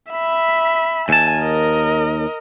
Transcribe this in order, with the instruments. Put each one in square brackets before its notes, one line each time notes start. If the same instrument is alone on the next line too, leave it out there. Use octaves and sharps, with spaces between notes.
[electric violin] E5 B5
[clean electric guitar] D#2 A5 [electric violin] G#5
[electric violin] A#4 D#5